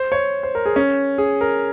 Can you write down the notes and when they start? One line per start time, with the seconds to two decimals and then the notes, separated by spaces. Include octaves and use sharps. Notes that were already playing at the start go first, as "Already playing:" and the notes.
Already playing: C5
0.12 C#5
0.43 C5
0.55 A#4
0.66 G#4
0.76 C#4
1.18 G#4
1.41 A#4